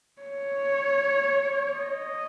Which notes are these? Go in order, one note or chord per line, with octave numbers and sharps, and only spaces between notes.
C#5
D#5